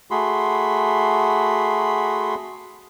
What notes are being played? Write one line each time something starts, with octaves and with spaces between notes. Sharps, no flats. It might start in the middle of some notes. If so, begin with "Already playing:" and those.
A3 F#4 G#4 B5 C6